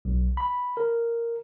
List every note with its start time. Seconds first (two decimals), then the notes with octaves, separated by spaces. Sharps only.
0.05 B1
0.37 B5
0.77 A#4